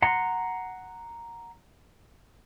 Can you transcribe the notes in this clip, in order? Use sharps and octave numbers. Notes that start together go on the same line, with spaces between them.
F#5 A#5 C6